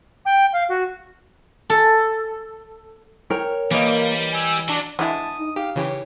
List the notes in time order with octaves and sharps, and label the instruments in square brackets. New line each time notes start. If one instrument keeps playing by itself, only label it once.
[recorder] G5
F5
F#4
[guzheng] A4
[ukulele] A#4 C#5 G5
[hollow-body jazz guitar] E3 D#5 [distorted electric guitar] G3 [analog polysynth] A#3
[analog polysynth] G#5 E6
[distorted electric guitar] F#3 [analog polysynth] D4
[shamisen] D3 G#3 G#4 [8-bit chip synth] E3 E4 [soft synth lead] A5 [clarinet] D#6
[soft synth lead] D#4
[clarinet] D#4 [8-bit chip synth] G4 [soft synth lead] F5
[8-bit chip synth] C#3 E3 G4 [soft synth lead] C#5